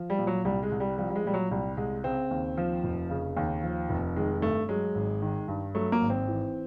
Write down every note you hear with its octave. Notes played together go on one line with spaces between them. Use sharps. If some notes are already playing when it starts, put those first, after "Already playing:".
Already playing: F3
G3
A#2
F#3
C2 G3
G#3
C2
G3
F3 G3
G3
G#3
A#2 G3
F#3
C2 G3
C2 G#3
C#3 C4
D#2
F3
F1
C#3
D#2
F3
F1
D#3 G#3
G2 A3
F#3 G#3
G#1
D#3
G2
F#3 A3
A#3
G#1
C4
E3